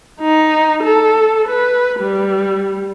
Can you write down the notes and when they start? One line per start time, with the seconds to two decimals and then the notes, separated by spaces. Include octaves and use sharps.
0.21 D#4
0.83 A4
1.48 B4
2.00 G3